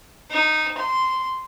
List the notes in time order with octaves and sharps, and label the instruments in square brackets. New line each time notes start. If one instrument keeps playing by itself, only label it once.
[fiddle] D#4
C6